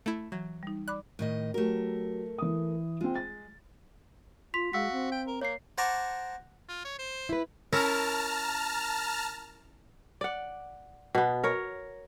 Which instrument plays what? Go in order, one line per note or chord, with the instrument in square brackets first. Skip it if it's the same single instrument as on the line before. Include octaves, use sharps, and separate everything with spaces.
[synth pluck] A3 E4
[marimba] E3 [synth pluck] F#3
[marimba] G3 D#4
[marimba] D5 B5 D6 [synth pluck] F#6
[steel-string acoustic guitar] A2 D#3 D#5
[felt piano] F#3 G4 [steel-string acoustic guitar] A3 A#4
[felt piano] E3 D#6
[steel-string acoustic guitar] G#3 [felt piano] C4 F4
[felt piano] A6
[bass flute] F4 [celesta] C6 B6 F7
[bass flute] G#3 [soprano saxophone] F#4 [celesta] F5 E6 B6
[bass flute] C4
[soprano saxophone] G5
A#4
[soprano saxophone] A#3 [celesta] C#5 C7
[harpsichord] C5 F#5 A5 A#5 C#6 D6
[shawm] F4
C#5
C5
[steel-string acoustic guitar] E4 B4
[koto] C#4 E4 A#4 [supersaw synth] A5 A#5 F6
[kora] D5 F#5
B2 B3
A#4 C#5